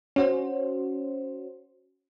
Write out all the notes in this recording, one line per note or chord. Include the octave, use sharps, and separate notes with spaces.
C#4 F#4 C5